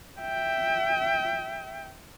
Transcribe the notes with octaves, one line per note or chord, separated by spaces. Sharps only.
E5 G5